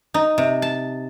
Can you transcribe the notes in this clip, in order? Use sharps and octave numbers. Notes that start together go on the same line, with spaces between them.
D#4
C3
A5